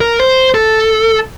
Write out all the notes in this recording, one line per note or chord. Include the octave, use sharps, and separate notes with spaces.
A#4
C5
A4